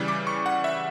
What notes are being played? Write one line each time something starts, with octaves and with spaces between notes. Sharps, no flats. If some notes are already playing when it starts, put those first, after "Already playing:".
Already playing: C#3 E3 G3
D6
C#6
F#5
E5